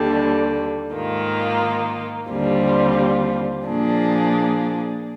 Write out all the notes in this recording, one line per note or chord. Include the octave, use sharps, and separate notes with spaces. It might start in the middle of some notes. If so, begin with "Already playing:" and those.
Already playing: D#2 D3 G3 D4
G#2 D#3 A#3 F4
D#2 D3 G3 C4 F4
A#2 F3 A#3 D4 G#4